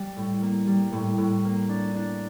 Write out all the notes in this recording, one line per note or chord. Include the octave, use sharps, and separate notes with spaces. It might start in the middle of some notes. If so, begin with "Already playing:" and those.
Already playing: G3
A2
A#3
G3
A2
A2
A#3
D4
D4